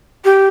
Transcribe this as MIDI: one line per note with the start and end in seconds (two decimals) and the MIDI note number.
0.25 0.47 67